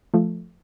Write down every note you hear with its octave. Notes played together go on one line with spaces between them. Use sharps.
F3 A3